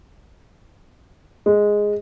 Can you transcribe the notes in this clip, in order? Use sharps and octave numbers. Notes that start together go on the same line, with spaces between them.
G#3